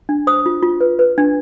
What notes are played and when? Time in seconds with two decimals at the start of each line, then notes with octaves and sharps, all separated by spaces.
0.09 D4
0.27 C5 D#6
0.46 F4
0.63 F4
0.81 B4
0.99 B4
1.18 D4